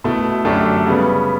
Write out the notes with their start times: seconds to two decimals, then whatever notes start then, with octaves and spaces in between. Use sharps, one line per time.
0.04 B2 A3 E4
0.45 F#2 D3 A3 D4 G4
0.86 C#3 G3 B3